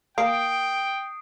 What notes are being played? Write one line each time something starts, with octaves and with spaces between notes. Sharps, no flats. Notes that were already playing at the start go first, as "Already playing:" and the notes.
A#3 G5 D#6 C7 D7